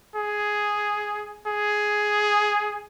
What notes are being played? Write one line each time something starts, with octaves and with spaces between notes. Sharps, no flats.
G#4
G#4